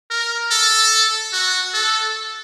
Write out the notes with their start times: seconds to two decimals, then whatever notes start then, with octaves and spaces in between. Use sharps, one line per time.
0.11 A#4
0.51 A4
1.33 F#4
1.74 A4